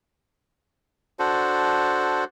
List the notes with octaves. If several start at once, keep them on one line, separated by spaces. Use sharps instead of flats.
D4 F#4 A4 C5